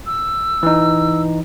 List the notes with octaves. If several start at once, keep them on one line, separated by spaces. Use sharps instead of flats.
E6
E3 D#4